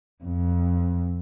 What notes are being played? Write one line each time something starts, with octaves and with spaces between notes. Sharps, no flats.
F2